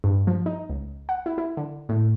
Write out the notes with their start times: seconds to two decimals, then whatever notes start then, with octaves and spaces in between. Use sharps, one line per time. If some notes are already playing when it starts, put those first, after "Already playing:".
0.04 G2
0.27 F3
0.46 D#4
0.69 C#2
1.09 F#5
1.26 E4
1.38 E4
1.57 D3
1.89 A2